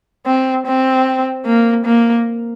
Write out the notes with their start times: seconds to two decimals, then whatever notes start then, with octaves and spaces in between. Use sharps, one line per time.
0.27 C4
0.67 C4
1.46 A#3
1.86 A#3